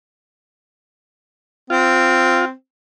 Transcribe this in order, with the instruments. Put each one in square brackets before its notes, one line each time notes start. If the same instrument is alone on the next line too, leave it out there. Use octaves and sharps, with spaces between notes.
[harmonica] C4 [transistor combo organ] F4